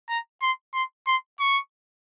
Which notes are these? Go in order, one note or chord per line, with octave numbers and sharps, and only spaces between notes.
A#5
C6
C6
C6
C#6